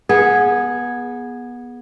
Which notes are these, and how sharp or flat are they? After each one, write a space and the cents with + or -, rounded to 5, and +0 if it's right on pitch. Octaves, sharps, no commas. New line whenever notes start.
B3 -20 G#4 +0